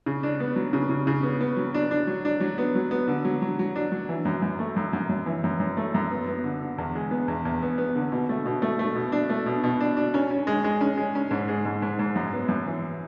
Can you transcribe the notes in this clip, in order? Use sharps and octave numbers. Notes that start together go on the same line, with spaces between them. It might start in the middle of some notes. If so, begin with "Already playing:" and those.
C#3
D4
B3
F#3
C#3
C#3
C#3
B3
B3
F#3
D4
D4
F#3
D4
F#3
B3
F#3
B3
D3
F#3
F#3
F#3
D4
F#3
E3
F#2
F#2
A3
F#2
F#2
F#2
E3
F#2
F#2
A3
F#2
B3
B3
D3
D3
E2
G#3
B3
E2
E2
B3
B3
D3
B2
A3
B2
A3
A3
B2
D4
A3
B2
B2
D4
D4
C#4
C#4
G#3
G#3
C#4
G#3
C#4
G#2
G#3
G#2
G#2
G#2
F#2
B3
F#2
E3